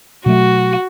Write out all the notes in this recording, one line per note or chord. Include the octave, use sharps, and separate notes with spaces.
B2 F#3 A3 F#4